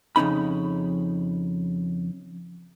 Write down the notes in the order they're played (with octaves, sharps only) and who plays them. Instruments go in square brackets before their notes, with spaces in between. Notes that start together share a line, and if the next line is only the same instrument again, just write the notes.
[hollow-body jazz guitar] F2 C#3 D#4 B5